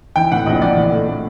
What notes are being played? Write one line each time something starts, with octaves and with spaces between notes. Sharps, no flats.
E3 G5
A2 F#5
A#1 D#5
A2 D5
E3
A3
A3